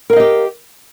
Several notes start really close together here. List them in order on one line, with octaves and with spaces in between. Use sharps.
A#4 F5 D#5 G4